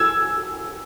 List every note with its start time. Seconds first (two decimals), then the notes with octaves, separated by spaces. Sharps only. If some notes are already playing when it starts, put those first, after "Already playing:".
Already playing: E6 G#6